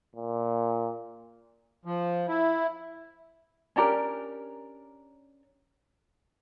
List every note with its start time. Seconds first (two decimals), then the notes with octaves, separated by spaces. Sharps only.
0.16 A#2
1.85 F3
2.28 E4
3.76 C#4 D4 G4 A#4